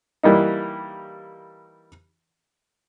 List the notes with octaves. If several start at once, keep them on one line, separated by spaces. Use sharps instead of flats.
E3 G3 A#3 D#4